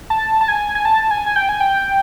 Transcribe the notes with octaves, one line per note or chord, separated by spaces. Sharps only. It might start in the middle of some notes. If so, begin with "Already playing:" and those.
A5
A5
G#5
G#5
A5
G#5
G#5
G5
G#5
G5